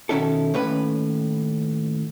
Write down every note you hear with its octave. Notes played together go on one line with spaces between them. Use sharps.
B2 D#3 C#4 E4 A4
D#2 A2 C#4 B4